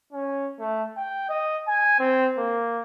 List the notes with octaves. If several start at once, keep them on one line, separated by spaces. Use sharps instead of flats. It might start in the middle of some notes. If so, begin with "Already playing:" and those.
C#4
A3
G5
D#5
G#5
C4
A#3